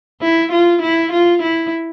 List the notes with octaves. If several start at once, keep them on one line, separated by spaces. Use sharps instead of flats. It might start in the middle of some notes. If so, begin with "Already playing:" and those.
E4
F4
E4
F4
E4